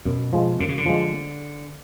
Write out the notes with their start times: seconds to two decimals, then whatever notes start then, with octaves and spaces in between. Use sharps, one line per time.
0.05 F#2 B2
0.33 F3 G#3
0.59 F#2 D3
0.69 C#3
0.78 D3
0.86 F3 G#3